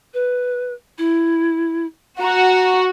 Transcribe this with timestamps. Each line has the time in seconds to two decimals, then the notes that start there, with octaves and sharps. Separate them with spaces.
0.14 B4
0.98 E4
2.20 F#4 A#5